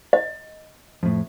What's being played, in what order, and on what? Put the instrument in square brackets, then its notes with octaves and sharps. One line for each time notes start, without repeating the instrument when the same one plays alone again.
[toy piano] D#5
[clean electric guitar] F2 A2